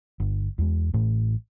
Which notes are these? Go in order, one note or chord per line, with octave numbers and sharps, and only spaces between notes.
G1
E2 G#3
A1 A2 A3